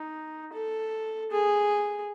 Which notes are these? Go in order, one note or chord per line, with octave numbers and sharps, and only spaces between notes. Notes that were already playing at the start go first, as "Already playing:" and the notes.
Already playing: D#4
A4
G#4